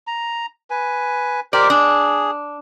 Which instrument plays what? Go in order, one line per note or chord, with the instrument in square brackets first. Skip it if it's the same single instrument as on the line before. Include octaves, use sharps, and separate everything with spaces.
[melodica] A#5
B4 G#5
[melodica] G4 A#4 C5 [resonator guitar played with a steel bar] D5
[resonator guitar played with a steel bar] D4 [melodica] G#4